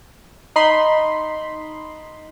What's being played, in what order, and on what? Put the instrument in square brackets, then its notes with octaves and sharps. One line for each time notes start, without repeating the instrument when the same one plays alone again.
[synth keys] D#4 B5 C6